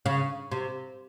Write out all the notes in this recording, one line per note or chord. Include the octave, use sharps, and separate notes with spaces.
C#3
C3